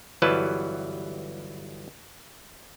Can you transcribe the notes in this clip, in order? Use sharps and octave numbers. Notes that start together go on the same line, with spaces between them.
G1 E3 F#3 G3 B4 A5